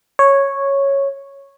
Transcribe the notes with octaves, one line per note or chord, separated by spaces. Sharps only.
C#5